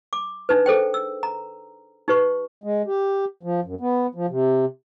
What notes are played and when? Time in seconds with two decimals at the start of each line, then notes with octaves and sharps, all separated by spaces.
0.13 D6
0.49 D4 D#4 B4
0.66 G#4 A4 C5 G5
0.94 E6
1.23 A#5
2.08 D#4 G4 B4 C#6
2.64 G#3
2.87 G4
3.43 F3
3.65 F#2
3.81 B3
4.15 F3
4.29 C3